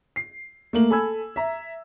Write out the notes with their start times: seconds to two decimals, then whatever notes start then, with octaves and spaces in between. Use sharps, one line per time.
0.16 C7
0.73 A3 A#3 F#7
0.90 A4 G#5 B5 E6 G#6
1.36 E5 A#5